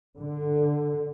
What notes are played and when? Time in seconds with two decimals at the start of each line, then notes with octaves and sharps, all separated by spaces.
0.17 D3